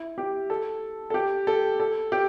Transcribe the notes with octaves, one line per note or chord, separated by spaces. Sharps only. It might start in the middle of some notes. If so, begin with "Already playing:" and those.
Already playing: E4
G4
A4
A4
G4
A4
A4
G4